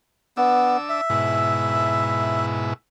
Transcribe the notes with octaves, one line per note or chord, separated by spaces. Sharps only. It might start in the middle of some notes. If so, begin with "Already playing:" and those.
B3 D4 E6
E5
G#2 B2 E4